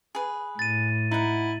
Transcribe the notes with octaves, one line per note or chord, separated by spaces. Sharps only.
G#4 B4
A2 A6 D#7
D#4 E4 F#5